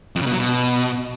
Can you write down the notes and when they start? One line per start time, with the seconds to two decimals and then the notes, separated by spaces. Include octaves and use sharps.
0.16 F2
0.21 C#3
0.27 B2
0.32 F#3
0.38 B2